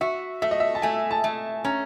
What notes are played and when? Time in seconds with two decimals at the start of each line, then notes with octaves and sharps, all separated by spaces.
0.01 F#4 E5
0.42 A3 E5
0.51 D#5
0.60 E5
0.75 A5
0.82 A3 G#5
1.11 A5
1.24 A3
1.65 C#4 A#5